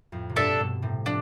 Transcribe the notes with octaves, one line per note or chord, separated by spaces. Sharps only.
F2 A2
C3
G2 B2 D4 A4 E5
G2 B2
A2 C3
F3 D4